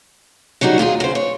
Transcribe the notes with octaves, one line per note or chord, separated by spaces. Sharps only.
C#3 F#3 G3 D#4 F#4
D#2 F4 G4 G#4
C#3 C5
C#5